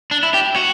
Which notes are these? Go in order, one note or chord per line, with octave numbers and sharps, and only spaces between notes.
D4
E4
G4
F#4